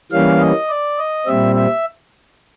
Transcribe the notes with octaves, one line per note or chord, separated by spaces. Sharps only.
E3 G3 A#3 C#4 F5
D#5
D5
D#5
A#2 G3 C4 E5
E5